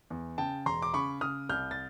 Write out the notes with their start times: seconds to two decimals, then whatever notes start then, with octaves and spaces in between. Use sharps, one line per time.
0.10 E2
0.38 C#3 G5 A5
0.66 E1 A#5 C6
0.82 D6
0.94 C#3 B5 C#6
1.21 C#3 D#6 F6
1.49 C2 F6 G6
1.71 A6